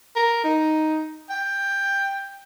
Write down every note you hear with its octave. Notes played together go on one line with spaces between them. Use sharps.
A#4
D#4
G5